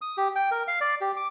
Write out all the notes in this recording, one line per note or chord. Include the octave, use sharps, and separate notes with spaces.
D#6
G4
G5
A#4
F5
D5
G4
D6